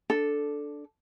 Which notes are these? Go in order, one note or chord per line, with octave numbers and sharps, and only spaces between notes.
D4 A4